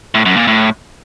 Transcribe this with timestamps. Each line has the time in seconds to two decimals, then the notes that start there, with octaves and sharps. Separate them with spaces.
0.15 A2
0.26 F#2
0.37 A#2
0.47 A2